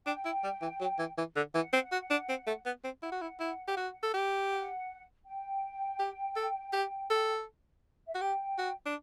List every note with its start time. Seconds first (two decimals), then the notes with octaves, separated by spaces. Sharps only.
0.06 D4 G5
0.25 E4
0.43 G3
0.62 E3
0.80 F#3
0.99 E3
1.17 E3
1.36 D3
1.54 E3 F#5
1.73 C4
1.92 F#4
2.10 D4
2.29 C4
2.47 A3
2.66 B3
2.84 C4
3.02 E4 F#5
3.12 F#4
3.21 E4
3.40 E4
3.68 G4
3.77 F#4
4.03 A4
4.14 G4
4.51 F#5
5.25 G5
5.99 G4
6.36 A4
6.73 G4
7.10 A4
8.07 E5
8.14 F#4 F#5
8.21 G4 G5
8.58 F#4
8.86 D4